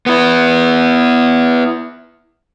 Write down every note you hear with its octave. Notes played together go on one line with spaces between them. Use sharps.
B3 E4